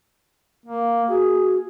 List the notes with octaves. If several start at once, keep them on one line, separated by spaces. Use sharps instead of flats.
A#3
F#4 G#4